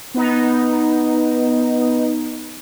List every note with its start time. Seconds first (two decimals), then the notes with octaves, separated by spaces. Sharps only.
0.14 B3 D#4